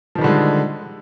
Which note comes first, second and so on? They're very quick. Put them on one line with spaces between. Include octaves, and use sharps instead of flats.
F3 D#3 G3 D3 G#3